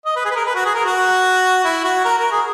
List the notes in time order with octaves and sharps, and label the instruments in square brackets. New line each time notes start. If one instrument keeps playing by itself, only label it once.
[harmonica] D#5
B4
G#4
B4
A#4
B4
F#4
G#4
A#4
F#4
E4
F#4
A#4
A#4
G#4